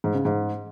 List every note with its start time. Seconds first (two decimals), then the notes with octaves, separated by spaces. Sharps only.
0.04 G#2
0.15 C#3
0.25 G#2